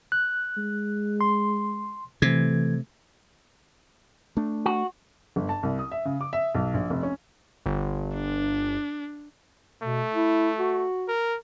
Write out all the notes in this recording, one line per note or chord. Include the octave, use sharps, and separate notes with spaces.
F#6
G#3
C6
C3 E3 A3 G#6
A3 D4
F#4
G1
A5
C2
D#6
E5
C#3
D6
E5
B1
A#1
F1
C#4
G1
D4
B2 A3
E4
F#4
A#4